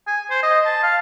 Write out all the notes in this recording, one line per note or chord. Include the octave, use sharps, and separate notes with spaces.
G#5
C5
D#5
A5
F5